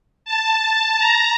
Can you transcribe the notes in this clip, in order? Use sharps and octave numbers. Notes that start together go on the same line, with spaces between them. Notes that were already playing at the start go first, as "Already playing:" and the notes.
A5
A#5